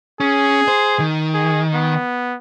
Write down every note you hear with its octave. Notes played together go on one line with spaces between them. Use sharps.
C#4 G#4
C5
D#3
G#4
B3